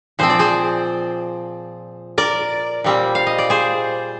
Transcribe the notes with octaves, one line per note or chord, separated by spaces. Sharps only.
A#2 F3 C4 C5
D5
G#4 C5
A#4 D5
A#2 G3 C4
F5
D#5
D5
G#4 C5